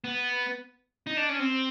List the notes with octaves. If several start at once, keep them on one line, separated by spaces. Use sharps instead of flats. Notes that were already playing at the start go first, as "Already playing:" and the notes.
B3
D#4
D4
C#4
C4